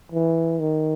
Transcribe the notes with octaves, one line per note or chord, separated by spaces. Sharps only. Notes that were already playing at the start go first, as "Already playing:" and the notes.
E3
D#3